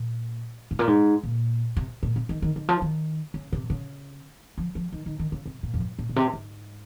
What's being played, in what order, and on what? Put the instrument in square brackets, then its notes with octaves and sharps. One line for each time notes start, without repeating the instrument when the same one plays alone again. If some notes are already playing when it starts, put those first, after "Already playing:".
Already playing: [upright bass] A#2
G#2
A#2
G#2
A#2
C3
A#2
C3
D#3
D#3
D#3
F3
D#3
C#3
C3
C#3
F3
F3
D#3
D#3
D#3
C#3
C3
A#2
F2
G2
A#2
A#2
C3
G#2